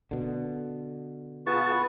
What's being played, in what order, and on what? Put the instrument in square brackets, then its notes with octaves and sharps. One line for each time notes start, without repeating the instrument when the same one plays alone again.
[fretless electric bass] B2 D3
[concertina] B3 B4 C#6 [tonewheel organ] F4 G#4 A5